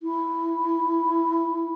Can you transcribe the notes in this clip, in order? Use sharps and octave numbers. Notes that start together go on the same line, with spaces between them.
E4